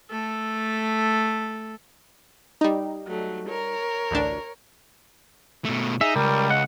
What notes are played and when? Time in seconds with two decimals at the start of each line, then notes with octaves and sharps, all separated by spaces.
0.11 A3 A4
2.61 G3 D#4
3.07 F#3 A3
3.48 A#4 C#5
4.11 A1 D2 D4
5.65 B2 A3
6.01 D#4 G#4 E5
6.16 C#2 G3 A#4
6.50 G#3 F#5